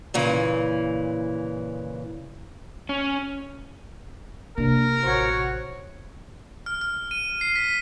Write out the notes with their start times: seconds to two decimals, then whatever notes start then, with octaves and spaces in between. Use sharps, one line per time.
0.14 A#2 C#3 E3
2.89 C#4
4.58 C3 A#3 D4 A#4
5.03 A1 F#4 C5 C#5
6.66 F6
6.81 F6
7.11 D#7
7.41 C7
7.56 B6